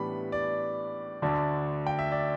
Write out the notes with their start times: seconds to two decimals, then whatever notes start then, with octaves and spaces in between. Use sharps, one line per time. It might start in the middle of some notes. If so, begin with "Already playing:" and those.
Already playing: A2 E3 G3 B3 D4 B5
0.32 D5
1.22 D2 D3 A3 D4
1.87 G5
1.99 E5
2.12 D5